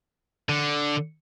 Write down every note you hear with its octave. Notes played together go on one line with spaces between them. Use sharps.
D3